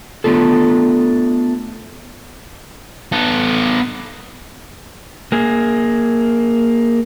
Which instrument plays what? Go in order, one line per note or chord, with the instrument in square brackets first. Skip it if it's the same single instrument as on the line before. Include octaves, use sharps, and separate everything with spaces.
[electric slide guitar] A3 B3 D4 F4 A4
[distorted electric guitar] B3 A4
[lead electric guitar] A#3 G#4